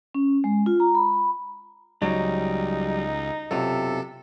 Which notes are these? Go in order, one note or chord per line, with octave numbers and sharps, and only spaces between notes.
C#4
G#3
F4
A#5
B5
C#2 F#3 G3 D#4
B1 F#2 C3 F4 A4